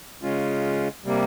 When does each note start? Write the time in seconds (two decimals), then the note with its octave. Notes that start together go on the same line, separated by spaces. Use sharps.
0.23 C#3 G#3 C#4 F4
1.05 C3 G3 A#3